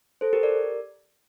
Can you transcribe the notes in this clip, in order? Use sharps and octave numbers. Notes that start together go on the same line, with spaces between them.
A4 C5
G4 A#4
A#4 D5